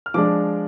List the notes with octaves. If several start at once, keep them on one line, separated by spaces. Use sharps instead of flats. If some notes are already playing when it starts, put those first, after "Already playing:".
F6
F3 G#3 D4 D6